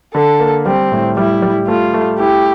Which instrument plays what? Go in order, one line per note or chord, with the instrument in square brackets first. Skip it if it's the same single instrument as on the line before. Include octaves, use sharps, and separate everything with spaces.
[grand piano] D3 [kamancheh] A4
[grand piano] A#3
[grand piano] G3 [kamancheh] C4
[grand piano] A2
[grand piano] G3 [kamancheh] E4
[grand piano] G3
[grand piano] A3 [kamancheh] F4
[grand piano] A3
[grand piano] E4 [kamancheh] G4